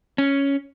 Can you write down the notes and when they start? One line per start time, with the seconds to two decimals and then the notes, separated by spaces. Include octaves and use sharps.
0.18 C#4